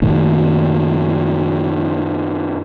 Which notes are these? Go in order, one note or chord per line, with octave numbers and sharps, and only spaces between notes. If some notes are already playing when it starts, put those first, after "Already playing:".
F#2 A#2 D#3 A3